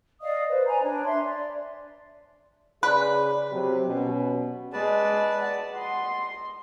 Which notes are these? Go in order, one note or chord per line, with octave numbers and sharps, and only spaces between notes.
D5 D#5 F5 D#6
B4 C5
D5 G#5 A#5 B5
D4 C#5
E5 C6
D5
C#3 G#4 B4 D5
C3 F#3
B2 C#4
G#3 B4 D5 A5
F#5
D#5 C6